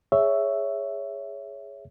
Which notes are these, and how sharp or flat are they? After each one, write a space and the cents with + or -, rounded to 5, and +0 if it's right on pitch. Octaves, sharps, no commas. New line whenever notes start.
G#4 -5 C#5 +10 E5 +0